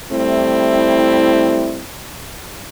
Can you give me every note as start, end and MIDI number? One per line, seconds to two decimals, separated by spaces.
0.12 1.83 55
0.12 1.83 57
0.12 1.83 60
0.12 1.83 64